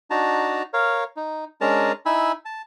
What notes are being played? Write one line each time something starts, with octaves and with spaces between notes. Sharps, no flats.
D4 D#4 F#4 A5 A#5
A#4 C#5 F5
D#4
G#3 C#4 D4 A#4 A5 A#5
D#4 E4 G#5 B5 E6
A5